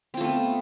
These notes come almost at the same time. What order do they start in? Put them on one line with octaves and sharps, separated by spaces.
C4 F4 A3 B3